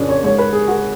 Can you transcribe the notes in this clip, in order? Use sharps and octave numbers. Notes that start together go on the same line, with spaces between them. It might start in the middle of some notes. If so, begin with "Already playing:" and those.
Already playing: F2 C#3 C#4 D4
C#5
G#2 C#5
B4
G#4
F#4